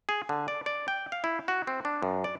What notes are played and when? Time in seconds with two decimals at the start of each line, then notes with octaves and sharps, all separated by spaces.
0.09 G#4
0.29 D3
0.48 D5
0.66 D5
0.88 G5
1.12 F5
1.24 E4
1.48 F#4
1.67 C4
1.85 D4
2.02 F#2
2.24 D5